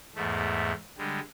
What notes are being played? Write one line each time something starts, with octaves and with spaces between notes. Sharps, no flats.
E2 G#2 A3
D3 G3 G#3